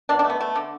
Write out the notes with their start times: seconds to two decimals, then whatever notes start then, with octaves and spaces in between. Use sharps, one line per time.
0.09 B2 D4
0.19 D4
0.24 A3
0.30 B3
0.40 A3
0.56 D3